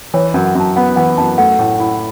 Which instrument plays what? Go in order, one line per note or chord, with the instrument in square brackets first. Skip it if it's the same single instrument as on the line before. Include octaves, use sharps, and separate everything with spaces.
[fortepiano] E3 [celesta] C#5
[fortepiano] F#2
[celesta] F#5
[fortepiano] F#2 [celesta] A5
[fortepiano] B3 [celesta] F#5
[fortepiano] E3 [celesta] F#5
[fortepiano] F#2 [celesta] A5
[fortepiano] A3 [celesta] F#5
[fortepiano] A2
E4